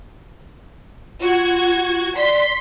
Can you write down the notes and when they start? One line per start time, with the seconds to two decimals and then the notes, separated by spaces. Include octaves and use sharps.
1.21 F4 F#4 G#6
2.17 D5 C6 B6